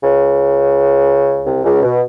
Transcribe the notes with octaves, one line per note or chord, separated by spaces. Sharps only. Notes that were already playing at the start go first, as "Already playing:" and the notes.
C#2 C#3
C2 C3
C#2 C#3
B2